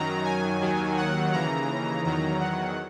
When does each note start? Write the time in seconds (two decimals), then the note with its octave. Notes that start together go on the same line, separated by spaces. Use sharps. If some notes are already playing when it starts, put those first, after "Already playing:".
Already playing: F#2 D#3 F#3 A#5
0.24 G#5
0.60 D#2 D#3 F#3
0.97 F#5
1.32 D#2 C#3 E3 A#5
2.04 E2 D#3 F#3 A#5
2.40 F#5